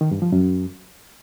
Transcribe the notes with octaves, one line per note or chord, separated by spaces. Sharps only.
D#3
G2
F3
F#2